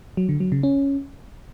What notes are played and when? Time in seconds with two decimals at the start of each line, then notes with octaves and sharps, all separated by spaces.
0.17 F#3
0.29 D3
0.40 F#3
0.52 C#3
0.63 C#4